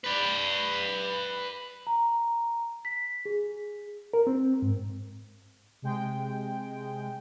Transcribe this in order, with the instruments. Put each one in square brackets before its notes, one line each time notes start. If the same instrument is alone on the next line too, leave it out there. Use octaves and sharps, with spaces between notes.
[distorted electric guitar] B4 D5
[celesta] A#5
B6
G#4
[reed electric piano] A#4
C4
G#2
[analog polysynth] C3 G#3 G5